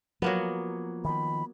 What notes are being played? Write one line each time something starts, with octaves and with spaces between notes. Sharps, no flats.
F3 F#3 A#3 B3
D#3 F3 B5